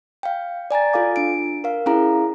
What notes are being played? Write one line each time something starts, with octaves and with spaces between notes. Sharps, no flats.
F5 G5
D5 G#5 A#5 A6
F4 A4 F5 D6
D4 D7
A#4 F5
C#4 E4 G#4 F5 A#5